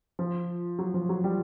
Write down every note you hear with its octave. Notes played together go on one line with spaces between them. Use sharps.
F3
F#3
F3
F#3
G3